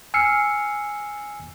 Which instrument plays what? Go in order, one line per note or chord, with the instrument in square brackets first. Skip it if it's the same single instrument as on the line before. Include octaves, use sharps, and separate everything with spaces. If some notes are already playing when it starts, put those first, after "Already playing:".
[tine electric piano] G#5 E6 F6 C7 C#7